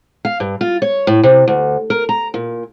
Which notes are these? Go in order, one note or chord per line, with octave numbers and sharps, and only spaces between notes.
F5
G2
F4
C#5
A2
C3
D2
A#4
A#5
A#2